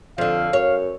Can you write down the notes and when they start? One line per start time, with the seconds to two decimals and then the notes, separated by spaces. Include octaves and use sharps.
0.18 F2 D3 F3 F5
0.53 F#2 C#5